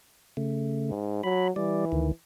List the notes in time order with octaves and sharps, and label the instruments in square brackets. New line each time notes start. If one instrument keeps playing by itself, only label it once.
[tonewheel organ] C#3 A3
[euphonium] G#2
[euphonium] F#3 [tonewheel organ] B5
[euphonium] E3 [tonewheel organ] G3 D5
[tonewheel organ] D2 D#3